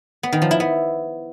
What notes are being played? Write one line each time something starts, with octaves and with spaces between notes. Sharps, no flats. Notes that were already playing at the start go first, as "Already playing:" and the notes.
B3
D#3
F3
E4
B3